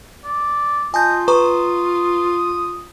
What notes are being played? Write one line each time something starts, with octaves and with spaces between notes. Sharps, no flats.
D5
F4 D#5 G#5 A5 G6
B4 A#5 C#6 D#6